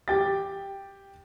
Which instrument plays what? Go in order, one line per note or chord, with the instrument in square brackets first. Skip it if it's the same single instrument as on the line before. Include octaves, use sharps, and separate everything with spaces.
[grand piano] G4 G5 A6